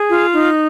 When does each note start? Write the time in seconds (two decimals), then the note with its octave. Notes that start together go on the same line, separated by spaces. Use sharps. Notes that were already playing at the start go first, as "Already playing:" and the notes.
Already playing: G#4
0.08 F4
0.32 D#4